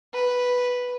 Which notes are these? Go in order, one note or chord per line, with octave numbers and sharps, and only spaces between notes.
B4